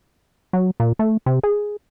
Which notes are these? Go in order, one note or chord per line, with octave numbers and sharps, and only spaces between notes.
F#3
A#2
A3
C3
G#4